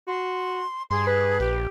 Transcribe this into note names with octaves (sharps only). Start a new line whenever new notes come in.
F#4 C6
G2 G#4 C6
B4
A#1 G4